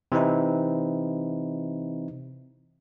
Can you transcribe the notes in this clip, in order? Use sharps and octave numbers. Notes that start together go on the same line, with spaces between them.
C3 E3 C4 D#4 E4